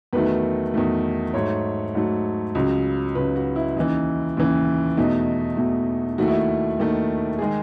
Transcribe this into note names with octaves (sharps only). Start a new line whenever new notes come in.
E2 D#3 F#3 A3 B4
E2 D#3 F#3 A3
G#2 F#3 A3 C#5
G#2 F#3 A3
C#2 C#3 F#3
C#2 C#3 F#3 B4
F#4
E4
D#2 C#3 E3 D#4
D#2 C#3 E3
E2 B2 A3 D#4
E2 B2 A3
D#2 D#3 A3 F#4
E4
F#4
D#2 D#3 A3
D#3 G#3 G#4